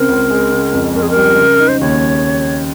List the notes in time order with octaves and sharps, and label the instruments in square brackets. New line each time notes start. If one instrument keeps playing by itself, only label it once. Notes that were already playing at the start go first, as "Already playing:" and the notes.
Already playing: [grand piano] C#3 C4 [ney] A#4
[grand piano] C#2
G#3
C#3
F2
[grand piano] F2 [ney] A#4
[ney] G#4
A#4
[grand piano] G3
C#3
D#4
[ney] C5
[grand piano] D#2 [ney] C#5